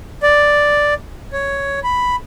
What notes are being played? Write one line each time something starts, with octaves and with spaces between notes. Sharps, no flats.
D5
C#5
B5